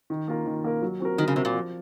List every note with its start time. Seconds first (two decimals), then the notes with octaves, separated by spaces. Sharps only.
0.10 D#3
0.28 A#3 F4 A#4
0.46 D#3
0.64 A#3 F4 A#4
0.82 F#3
1.00 C4 F#4 A#4
1.18 D#3 F#3
1.28 C#3
1.36 C3 C4 F#4 A#4
1.45 A#2
1.54 F3